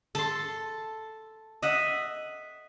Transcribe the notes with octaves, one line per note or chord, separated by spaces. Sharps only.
A4 C6
D#5 E5 F#5